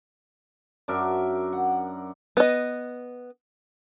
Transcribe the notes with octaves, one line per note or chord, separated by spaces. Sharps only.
F#2 D4 A#4 E5
F#5
B3 D#5